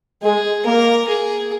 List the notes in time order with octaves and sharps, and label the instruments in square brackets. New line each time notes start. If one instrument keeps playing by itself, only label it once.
[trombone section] G#3 [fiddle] G#4
[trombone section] A#3 [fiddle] A#4
[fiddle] G#4